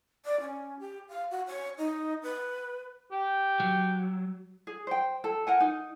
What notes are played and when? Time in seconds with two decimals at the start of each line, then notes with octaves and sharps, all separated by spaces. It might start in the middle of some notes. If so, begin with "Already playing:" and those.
0.25 D5
0.40 C#4
0.79 G4
1.09 F5
1.31 F#4
1.47 C#5
1.78 D#4
2.23 B4
3.12 G4
3.60 F#3
4.67 G#4
4.87 C5 G5
5.24 A4
5.47 A#4 F#5 G#5
5.60 D#4